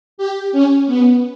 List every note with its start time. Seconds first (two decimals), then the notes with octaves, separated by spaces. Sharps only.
0.18 G4
0.52 C#4
0.87 B3